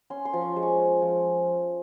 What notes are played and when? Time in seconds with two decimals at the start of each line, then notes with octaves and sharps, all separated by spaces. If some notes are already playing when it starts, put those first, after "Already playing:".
0.10 C#4 C6
0.25 C6
0.33 F3
0.41 C#6
0.56 G#3
0.63 C#6
0.80 C#4
1.02 F3